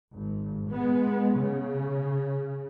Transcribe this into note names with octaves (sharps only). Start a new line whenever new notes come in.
G#1
G#3 B3
C#3